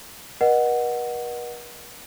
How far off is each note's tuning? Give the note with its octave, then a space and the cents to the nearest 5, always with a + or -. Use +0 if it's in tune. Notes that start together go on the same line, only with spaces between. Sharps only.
B4 -45 D#5 -25 F#5 +0